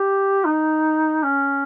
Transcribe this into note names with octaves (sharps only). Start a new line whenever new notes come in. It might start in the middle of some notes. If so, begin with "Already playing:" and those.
Already playing: G4
D#4
C#4